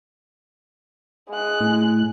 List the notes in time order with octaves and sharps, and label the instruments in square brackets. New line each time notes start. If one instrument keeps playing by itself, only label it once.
[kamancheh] G#3 F#6
[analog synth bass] A2